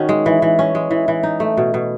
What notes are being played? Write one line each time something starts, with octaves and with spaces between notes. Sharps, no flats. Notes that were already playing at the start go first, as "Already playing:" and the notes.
Already playing: D#3 C#4 F#4
G#3
E3
E3
C#4
G#3
E3
E3
D#4
A3
B2
B2